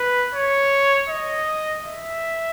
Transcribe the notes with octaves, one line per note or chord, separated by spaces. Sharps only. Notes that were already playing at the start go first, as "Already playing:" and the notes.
Already playing: B4
C#5
D#5
E5